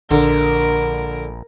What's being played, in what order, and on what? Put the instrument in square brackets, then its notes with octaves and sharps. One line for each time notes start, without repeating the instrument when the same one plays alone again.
[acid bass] A#1 [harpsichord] D3 C6 [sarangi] A#4